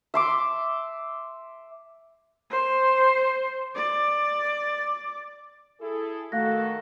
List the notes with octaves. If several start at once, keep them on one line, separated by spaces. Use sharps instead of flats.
E5 C6 D6
C5
D5
E4 G#4 A4
D#3 A3 F#4 A4 F5 F#6 A#6